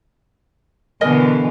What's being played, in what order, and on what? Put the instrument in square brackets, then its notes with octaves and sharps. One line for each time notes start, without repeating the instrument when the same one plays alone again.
[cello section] B2 D3 E3 [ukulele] A#4 D#5 G#5